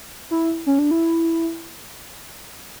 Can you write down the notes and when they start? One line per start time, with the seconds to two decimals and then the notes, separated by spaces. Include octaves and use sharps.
0.31 E4
0.66 C#4
0.79 D4
0.91 E4